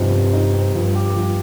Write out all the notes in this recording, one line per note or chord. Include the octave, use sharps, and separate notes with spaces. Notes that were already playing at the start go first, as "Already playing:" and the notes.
Already playing: G2 C3 F3 C4 D#4
C3
D#4
C4
G2 F3
G4
F3